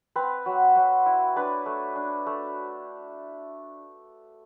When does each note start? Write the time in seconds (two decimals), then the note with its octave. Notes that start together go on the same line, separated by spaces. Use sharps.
0.16 C4 B4
0.46 F#3
0.76 F#3
1.06 E4
1.36 D4 B4
1.66 A3
1.96 D4
2.26 A3